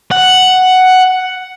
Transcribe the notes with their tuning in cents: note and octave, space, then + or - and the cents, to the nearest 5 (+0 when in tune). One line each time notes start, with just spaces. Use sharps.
F#5 +5